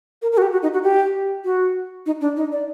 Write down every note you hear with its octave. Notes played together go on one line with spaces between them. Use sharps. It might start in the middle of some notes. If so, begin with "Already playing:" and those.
A#4
A#4
F#4
G4
F#4
D#4
F#4
G4
F#4
D#4
D4
D#4
D5